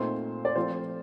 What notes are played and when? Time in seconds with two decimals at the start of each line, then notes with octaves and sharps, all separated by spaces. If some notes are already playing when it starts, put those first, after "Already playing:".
Already playing: A#2 A3 C4 D#4 C5
0.45 D5
0.56 F3 A3 C4 F4 C5